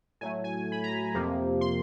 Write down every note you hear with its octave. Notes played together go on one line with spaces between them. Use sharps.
A2 F#3 A3 G#5
G#5
B5
A#5
F2 C3 F3 A#3
C6